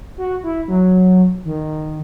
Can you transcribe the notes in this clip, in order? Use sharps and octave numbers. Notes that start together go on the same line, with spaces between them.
F#4
E4
F#3
D#3